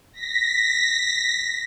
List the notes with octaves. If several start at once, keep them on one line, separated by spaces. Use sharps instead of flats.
A#6 B6